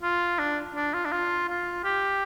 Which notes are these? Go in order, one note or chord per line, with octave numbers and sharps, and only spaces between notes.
F4
D4
D4
F4
D4
F4
F4
G4